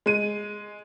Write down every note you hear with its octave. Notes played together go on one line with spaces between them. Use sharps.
G#3 D#7